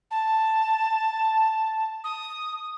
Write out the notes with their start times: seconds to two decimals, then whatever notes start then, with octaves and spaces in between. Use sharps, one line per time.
0.11 A5
2.04 D#6